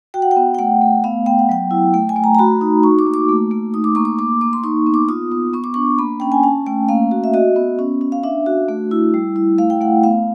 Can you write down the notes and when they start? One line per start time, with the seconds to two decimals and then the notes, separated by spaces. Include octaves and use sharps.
0.14 F#4 G5
0.22 F#5
0.31 G5
0.36 B3
0.55 G5
0.59 A3 F#5
0.81 A3
1.04 B3 F5
1.26 B3 G5
1.39 F#5
1.49 F#3 G5
1.71 E4
1.94 A3 G5
2.09 G#5
2.16 A3
2.24 A#5
2.35 A#5
2.39 F#4 B5
2.61 D#4
2.83 F#4 C#6
2.99 D6
3.06 A#3
3.14 D6
3.29 A3
3.51 A3
3.74 D#4 D#6
3.84 D6
3.95 A#3 C#6
4.05 D6
4.19 A#3 D6
4.41 A#3 D6
4.53 C6
4.64 D#4 C#6
4.86 B3
4.94 D6
5.09 F4 D#6
5.32 B3
5.53 B3 C#6
5.64 D6
5.74 D4 C#6
5.99 A#3 B5
6.20 C#4 G5
6.32 G#5
6.43 C#4 A5
6.66 A3 G5
6.89 A#3 F5
7.11 F#4
7.24 E5
7.34 F#4 D#5
7.56 B3
7.79 C#4
8.01 C#4
8.12 F5
8.23 D4 E5
8.46 F#4
8.69 A3
8.91 E4
9.14 G3
9.36 E4
9.58 A3 F5
9.70 G5
9.81 A3 F#5
10.04 B3 F5